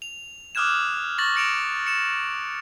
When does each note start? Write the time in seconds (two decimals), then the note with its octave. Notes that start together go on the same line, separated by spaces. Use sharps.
0.02 F7
0.55 D6 D#6 F6 F#6 G#6 E7
1.18 C#6 A6 A#6 F#7
1.36 A#6 C#7 D7 E7 F7
1.86 C#7 E7